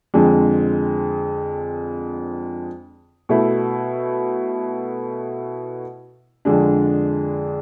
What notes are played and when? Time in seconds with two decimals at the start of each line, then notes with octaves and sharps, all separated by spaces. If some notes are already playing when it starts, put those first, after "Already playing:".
0.14 F2 D3 G#3 C4
3.29 B2 A3 E4
6.45 F2 D3 G#3 D4